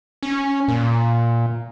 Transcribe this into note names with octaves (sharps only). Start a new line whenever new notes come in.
C#4
A#2